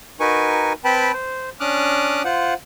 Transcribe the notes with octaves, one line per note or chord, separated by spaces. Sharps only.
D#4 F#4 A#4 B4 G#5 C#6
C4 B4 G5 A5 B5
C5
C#4 D4 D6 D#6 F6 F#6
F4 C5 F#5